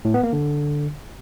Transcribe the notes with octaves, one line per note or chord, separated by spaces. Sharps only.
A2
B3
A#3
D3